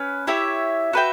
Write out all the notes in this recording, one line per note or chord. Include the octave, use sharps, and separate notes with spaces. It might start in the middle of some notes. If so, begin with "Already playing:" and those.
Already playing: C#4 B4
E4 G4 C#5 E5
F#4 B4 E5 G5